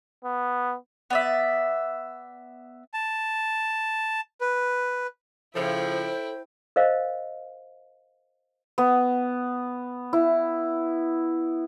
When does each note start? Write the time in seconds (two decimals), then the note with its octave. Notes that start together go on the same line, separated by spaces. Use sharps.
0.25 B3
1.10 B3 D5 E5
2.94 A5
4.41 B4
5.55 C#3 F3 E4 A4 C5 C#5 E5 G5
6.76 A#4 C5 D#5 F5
8.78 B3
10.13 E4